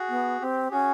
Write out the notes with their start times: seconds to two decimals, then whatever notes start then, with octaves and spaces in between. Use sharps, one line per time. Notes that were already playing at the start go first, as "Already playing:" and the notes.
Already playing: F#4 G#4
0.09 B3
0.41 C4 G4
0.71 C#4 F#4 G#4